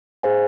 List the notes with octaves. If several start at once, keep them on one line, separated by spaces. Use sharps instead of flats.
G#4 C5 F5 G#5